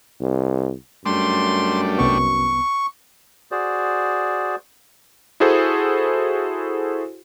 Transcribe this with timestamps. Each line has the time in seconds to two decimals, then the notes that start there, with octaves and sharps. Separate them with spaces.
0.21 C2
1.06 F#2 G3 A3 D4 C6
1.98 C2 B3 C#6
3.51 F#4 G#4 C5 D5
5.40 E4 F#4 G#4 A4 C5